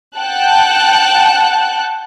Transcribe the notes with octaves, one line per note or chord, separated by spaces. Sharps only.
F#5 G5 A5 F#6